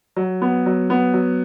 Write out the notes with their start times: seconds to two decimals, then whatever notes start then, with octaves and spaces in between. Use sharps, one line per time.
0.16 F#3
0.42 B3
0.66 F#3
0.90 B3
1.14 F#3